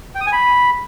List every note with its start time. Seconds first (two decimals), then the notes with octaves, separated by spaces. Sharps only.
0.15 G5
0.21 D#6
0.27 G#5
0.32 B5